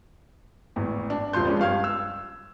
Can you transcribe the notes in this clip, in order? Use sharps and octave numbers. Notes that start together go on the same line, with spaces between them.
G#1 E2 A2
D4
D#1 F3 F4 C6 G6
F3 G#3 C#4 D4
G2 F5 F6 G#6
E6